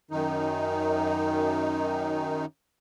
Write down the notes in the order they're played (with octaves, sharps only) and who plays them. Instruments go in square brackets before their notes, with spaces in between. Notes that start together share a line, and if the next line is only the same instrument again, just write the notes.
[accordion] F#2 D#3 D#4